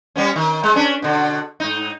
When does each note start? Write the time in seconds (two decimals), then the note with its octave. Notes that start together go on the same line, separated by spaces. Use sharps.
0.16 G3 B3 C#4
0.36 D#3
0.63 G#3
0.75 C#4 D4 B4
1.02 B2 D3
1.60 G#2 D#4